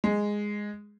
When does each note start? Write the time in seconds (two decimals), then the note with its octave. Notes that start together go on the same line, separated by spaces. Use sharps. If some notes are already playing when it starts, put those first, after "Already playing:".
0.04 G#3